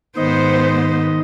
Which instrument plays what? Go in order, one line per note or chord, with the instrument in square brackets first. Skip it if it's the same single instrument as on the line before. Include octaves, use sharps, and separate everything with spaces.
[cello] G#2 B3 [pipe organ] D#3 D#5 [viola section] C5